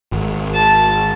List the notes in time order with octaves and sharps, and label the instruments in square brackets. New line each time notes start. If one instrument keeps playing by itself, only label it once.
[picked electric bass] G#1
[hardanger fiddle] A5